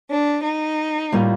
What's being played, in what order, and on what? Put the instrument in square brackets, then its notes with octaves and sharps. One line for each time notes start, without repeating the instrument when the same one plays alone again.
[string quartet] D4
D#4
[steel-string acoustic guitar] A2 G3 A#3 F4